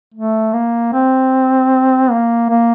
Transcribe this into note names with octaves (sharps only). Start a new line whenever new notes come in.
A3
A#3
C4
A#3
A#3